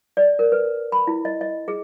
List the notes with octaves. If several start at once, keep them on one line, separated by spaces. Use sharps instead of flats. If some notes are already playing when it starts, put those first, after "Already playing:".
D5
A#4
B4
B5
E4
D#5
D#5
G#4